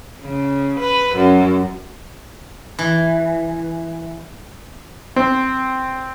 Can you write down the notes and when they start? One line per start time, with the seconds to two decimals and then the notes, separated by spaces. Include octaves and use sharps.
0.22 C#3
0.80 B4
1.16 F#2
2.79 E3
5.16 C4